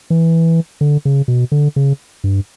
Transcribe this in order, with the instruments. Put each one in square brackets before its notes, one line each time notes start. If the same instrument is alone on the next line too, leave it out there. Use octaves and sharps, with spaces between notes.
[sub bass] E3
D3
C#3
B2
D3
C#3
G2